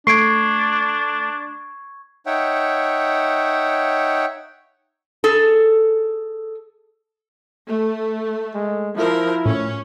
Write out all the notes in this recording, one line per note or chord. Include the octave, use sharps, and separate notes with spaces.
A3 D4 C#6 G#6 C7 D7
D#4 C#5 E5 F#5 G5
G#4 A4
A3
G#3
F3 E4 A#4
A2 C#4